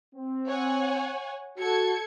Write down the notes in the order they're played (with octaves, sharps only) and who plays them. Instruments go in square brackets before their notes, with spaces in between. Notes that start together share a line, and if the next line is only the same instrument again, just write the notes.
[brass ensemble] C4
[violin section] C#5 F#5 G#5
[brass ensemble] F#4 [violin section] A4 G#6 C#7